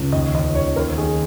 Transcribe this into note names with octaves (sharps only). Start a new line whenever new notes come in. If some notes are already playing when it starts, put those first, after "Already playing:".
Already playing: C#2
D#2 D#5
D#2 D#5
D#2 C#5
D#2 A#4
D#3 G#4